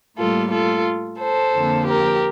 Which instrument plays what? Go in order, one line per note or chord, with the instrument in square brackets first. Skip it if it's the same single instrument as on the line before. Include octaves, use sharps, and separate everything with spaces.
[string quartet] A2 G3 A#3 F4 A4
F4 A4
A4 C5
F2 D3 F3 A#3
G4 A#4